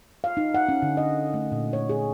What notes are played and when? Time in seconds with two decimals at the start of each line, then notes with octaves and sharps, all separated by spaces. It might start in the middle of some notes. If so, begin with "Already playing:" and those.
0.24 F5
0.37 D#4
0.54 F#5
0.69 C#4
0.82 D3
0.97 D#5
1.34 A3
1.52 A#2
1.73 C#5
1.90 G#4